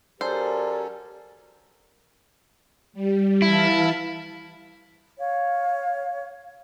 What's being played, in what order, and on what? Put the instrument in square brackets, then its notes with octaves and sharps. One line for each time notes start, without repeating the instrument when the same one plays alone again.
[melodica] F#3 C#4 A4 [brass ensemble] G4 A#4 [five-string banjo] C5 [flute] D5
[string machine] G3
[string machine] E3 F5 A5 [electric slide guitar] E4
[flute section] C#5 F5